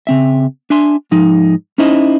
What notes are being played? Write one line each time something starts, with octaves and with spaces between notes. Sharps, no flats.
C#3 C4 E5
D4 E5 G#5 C6
G#2 F3 D#4
C#4 D#4 E4 C5 D#5